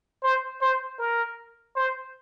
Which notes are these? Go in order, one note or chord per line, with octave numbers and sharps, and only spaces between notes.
C5
C5
A#4
C5